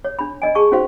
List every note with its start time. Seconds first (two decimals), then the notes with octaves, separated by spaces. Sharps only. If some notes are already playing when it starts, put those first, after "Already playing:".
0.05 C#5
0.19 D4 B5
0.42 D5 D#5 G#5
0.55 G#4 A5 C#6
0.72 C#4 D#4 F#4 C5 F5